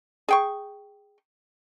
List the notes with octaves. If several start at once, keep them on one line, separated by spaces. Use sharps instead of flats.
G#4 G5 C#6